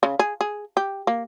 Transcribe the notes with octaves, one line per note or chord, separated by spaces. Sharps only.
C#3
G#4
G#4
G4
A#3